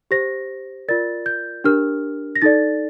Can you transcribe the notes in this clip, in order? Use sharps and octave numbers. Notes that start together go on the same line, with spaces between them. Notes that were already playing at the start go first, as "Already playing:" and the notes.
G4 C5 A#6
F4 A#4 D5 A6
G6
D4 G4 A#4 F6
A#6
D#4 A4 D5 A6